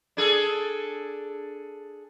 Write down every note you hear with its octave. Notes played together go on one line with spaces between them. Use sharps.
D4 G#4 A4